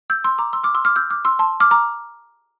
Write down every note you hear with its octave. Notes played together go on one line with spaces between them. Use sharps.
E6 G6
C6 E6
A#5 D6
C6 E6
D6 F6
C6 E6
D6 F6
E6 G6
D6 F6
C6 E6
A5 C6
D6 F6
A#5 D6